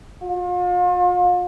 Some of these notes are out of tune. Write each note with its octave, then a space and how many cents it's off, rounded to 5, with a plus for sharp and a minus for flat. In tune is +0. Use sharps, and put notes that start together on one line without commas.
F4 +40